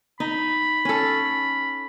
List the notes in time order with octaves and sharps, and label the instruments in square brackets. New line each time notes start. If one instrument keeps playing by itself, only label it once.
[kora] D#4 [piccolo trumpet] B5
[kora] C#4 A4